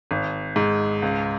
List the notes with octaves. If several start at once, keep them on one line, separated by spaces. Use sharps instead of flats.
G#1
G#2
C#2